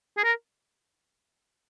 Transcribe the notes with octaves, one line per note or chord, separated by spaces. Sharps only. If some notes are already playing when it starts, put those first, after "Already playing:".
G#4
A#4